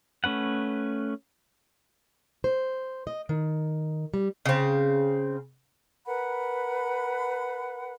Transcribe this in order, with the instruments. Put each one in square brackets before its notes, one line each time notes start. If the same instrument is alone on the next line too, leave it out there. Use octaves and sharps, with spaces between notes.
[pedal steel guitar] A3 C#4 B4 F#5
[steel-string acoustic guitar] C5
D#5
D#3
G3
[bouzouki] C#3 C4
[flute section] A#4 B4 F#5 B5